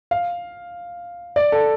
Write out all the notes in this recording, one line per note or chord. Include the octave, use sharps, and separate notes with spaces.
F5
D5
A4